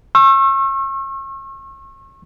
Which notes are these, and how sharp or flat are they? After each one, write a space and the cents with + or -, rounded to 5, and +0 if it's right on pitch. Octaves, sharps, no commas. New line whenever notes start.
C#6 -35 E6 +20